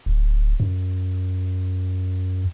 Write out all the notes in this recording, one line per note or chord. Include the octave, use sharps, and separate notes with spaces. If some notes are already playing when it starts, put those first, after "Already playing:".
D1
F#2